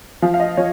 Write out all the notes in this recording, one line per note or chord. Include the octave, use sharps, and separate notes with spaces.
F3 F5
F5
D#5
F3 C#5